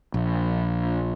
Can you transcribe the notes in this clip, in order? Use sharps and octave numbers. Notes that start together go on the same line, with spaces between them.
A#1